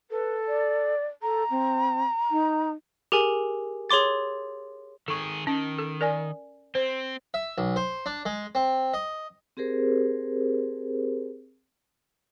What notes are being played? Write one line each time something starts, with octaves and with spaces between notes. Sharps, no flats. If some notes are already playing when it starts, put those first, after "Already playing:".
A4 B4
D5
A4 A#5
C4
D#4
G4 G#4 A#4 G#5
G#4 C#5 C6 D6 A6
D#3 G#4 A4 C#6
D#3 C#4
A4
A#4 D5 G#5
C4 C5
E5
B1
C5
D4
G#3
C4
D#5
C4 G4 G#4 A#4 C5